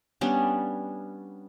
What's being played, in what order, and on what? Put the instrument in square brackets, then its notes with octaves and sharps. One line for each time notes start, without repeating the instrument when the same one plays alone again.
[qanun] G3 B3 C#4 D4